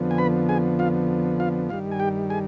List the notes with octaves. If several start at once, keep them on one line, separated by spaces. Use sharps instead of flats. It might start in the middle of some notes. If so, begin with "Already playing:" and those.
Already playing: F2 D3 F3 B3
G#5
B4 B5
G#4 G#5
F4 F5
F4 F5
G2 D#3 G3 F4 F5
G#5
G4 G5
G#4 G#5